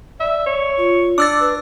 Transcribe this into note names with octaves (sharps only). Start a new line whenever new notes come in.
D5 E5
C#5
F4
D4 D6 E6 A6
B4